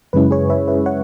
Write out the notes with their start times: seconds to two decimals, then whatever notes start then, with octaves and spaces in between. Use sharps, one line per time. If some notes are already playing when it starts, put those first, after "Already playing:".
0.13 F#2 C#3 G#3 C#4 E4 B4
0.31 G#4 C#5
0.50 B4 E5
0.68 B4 E5
0.86 C#5 F#5